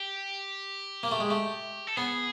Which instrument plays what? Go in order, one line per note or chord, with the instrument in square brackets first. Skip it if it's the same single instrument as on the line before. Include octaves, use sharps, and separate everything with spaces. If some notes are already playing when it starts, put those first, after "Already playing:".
Already playing: [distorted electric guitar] G4
[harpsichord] A#3
A3
G#3
A3
[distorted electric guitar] A4
[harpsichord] B3 [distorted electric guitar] G#4